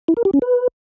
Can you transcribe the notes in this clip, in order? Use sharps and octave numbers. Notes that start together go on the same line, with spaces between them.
E4
A#4
G4
C#4
B4